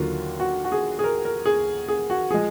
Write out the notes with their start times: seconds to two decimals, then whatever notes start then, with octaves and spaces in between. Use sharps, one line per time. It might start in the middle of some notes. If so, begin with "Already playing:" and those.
Already playing: D#2 D3 F#3 A#3 F4
0.40 F#4
0.64 F#4
0.72 G#4
0.99 G#4
1.04 A#4
1.25 A#4
1.46 G#4
1.89 G#4
2.10 F#4
2.31 F3 G#3 G#4